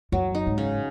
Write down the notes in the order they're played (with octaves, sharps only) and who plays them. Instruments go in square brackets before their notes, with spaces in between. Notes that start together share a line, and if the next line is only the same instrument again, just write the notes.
[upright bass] F#2 [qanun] F#3
[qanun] D#4
[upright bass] G#2
[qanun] C#3